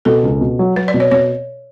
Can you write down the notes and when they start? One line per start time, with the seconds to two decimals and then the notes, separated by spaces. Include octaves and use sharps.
0.05 B2 A4
0.23 C#2
0.41 B2
0.59 F#3
0.76 F#3 B4
0.88 D5
0.94 B2
1.00 C#5
1.11 B2 C#5